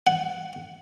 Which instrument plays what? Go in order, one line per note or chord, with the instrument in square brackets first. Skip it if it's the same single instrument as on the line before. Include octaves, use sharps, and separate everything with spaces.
[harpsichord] F#5